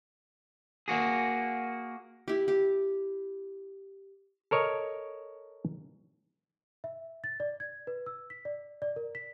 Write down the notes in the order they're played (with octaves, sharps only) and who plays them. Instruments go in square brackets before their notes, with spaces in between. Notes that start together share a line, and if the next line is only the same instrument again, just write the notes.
[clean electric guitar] A#3 F#4 G#4
[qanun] E4 G4
G4
[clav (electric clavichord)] A4 A#4 C#5 D#5
[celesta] E5
A6
D5
G#6
B4
E6
B6
D5
D5
A#4
B6